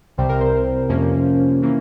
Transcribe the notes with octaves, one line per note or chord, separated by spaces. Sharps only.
C2 C3 G3 C4 C5
A#4
C5
F2 C3 F3 A#3 C#4
E3 A#3 C#4